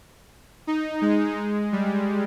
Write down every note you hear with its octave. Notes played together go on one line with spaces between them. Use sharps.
D#4
G#3
G3